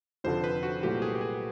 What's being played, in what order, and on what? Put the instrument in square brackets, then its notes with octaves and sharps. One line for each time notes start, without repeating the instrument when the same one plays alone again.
[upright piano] F1 F2 D3 F3 [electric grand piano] C5
[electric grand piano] B4
F#4
[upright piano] C2 A#2 F#3 A3 [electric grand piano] G4
[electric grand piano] G#4
G4
G#4